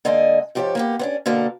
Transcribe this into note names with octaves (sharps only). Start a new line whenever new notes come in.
D3 G#3 A#3 D#5 G#5
G#2 F3 G4 A4 C#5
A#3 B3 G4
B3 C#4 D4
B2 D3 A#3 A4 A#4